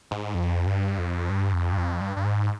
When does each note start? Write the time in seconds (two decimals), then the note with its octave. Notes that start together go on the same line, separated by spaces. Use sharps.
0.11 G#2
0.35 F2
0.67 G2
0.98 F2
1.30 G2
1.53 F2
1.72 G2
1.77 F2
2.01 G2
2.17 G2
2.25 G#2